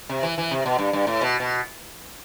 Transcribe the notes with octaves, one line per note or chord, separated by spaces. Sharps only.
C3
E3
E3
C3
B2
G2
G2
A2
B2
B2